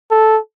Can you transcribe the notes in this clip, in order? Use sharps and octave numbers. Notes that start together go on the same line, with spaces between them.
A4